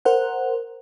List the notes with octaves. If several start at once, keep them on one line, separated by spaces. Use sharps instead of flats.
A#4 C5 F#5